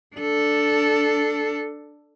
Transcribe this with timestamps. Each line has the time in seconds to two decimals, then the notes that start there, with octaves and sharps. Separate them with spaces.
0.16 D4 A4